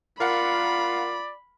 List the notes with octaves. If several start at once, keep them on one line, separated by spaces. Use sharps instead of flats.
F4 A#4 D5 F5 F#5 B5